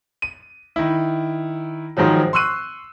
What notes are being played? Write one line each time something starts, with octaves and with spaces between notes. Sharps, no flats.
D#7
D#3 E4
G#2 D#3 F3 F#3
C6 C#6 E6 F#6 D#7